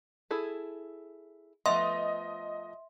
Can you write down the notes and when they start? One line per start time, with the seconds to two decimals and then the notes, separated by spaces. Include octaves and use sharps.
0.31 E4 G#4 A4
1.66 F3 A3 B3 D#5 E5 C6